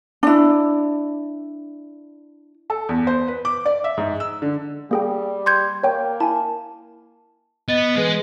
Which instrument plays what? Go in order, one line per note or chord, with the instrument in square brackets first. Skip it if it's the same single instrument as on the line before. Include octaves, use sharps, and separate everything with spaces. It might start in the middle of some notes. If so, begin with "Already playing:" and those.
[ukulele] D4 E4
[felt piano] A4
E2
C5
B4
D6
D5
E5
G#2
E6
D3
[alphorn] G3 [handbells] A#3 G#4 G5
[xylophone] C6 G6 G#6
[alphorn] A#3 [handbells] C#5 G5
[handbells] E4 G#5 [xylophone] A5
[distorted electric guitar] B3 [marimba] D#5 A6
[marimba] E3 G#4 B4 [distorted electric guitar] G#3